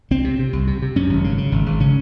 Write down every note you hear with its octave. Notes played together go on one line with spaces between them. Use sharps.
C2 C4
C3
C3
C2
C3
C3
F#2 C#4
G#1
C#3
C#3
G#1
G#1
C#3 C#4